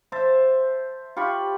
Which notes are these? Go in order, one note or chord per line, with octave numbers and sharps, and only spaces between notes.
C5 E5 A5
F4 G4 B5 C#6